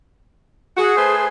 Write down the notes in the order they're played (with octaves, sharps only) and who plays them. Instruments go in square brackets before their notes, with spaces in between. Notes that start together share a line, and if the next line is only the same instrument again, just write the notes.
[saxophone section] F#4 [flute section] G#4
[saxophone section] A3 B4 C5